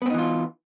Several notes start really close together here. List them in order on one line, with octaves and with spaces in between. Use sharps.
B3 C4 D#4 E3 F4